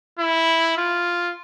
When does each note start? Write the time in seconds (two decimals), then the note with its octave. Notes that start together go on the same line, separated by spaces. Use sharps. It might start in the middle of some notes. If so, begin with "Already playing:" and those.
0.19 E4
0.77 F4